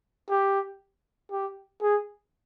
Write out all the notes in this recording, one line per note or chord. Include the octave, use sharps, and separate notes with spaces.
G4
G4
G#4